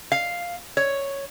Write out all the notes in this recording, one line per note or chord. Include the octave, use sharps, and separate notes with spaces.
F5
C#5